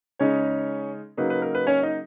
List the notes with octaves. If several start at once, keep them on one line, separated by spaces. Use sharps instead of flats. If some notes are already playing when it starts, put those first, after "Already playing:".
C#3 G#3 C#4 D#4 C#5
C#3 F#3 A#3 D#4 B4
B4
A#4
B4
C#4 C#5
D#4 D#5